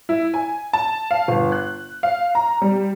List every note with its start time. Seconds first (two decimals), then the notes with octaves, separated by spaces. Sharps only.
0.09 E4
0.34 G#5
0.73 A5
1.11 F5
1.28 G1
1.52 F#6
2.03 F5
2.35 A#5
2.62 G3